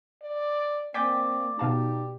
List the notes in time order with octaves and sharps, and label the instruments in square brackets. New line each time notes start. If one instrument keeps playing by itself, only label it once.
[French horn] D5
[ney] A#3 [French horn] C4 [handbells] D5 D6 [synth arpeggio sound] G5 G#5 B6
[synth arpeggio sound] B2 F5 A5 [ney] D#4 [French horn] G4